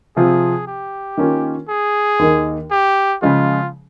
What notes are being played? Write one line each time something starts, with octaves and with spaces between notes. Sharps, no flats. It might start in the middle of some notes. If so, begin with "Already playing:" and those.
C3 F3 C4 F4 G#4
G4
D#3 A#3 C#4 F4 A#4
G#4
D#2 D#3 A#3 D#4
G4
C#3 F3 G#3 C#4 F4 G#4